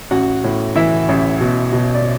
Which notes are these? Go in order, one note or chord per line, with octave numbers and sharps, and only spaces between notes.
A1 F#4 F#5
A2
E3 E4 E5
A1
B2
B2
D5